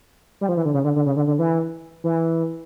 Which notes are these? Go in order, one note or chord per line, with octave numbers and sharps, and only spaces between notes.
G3
F3
E3
D3
C#3
D3
D3
C#3
D3
D3
E3
E3